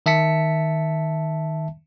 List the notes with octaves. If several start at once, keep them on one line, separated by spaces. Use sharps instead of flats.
D#3 E5 A5 B6 C#7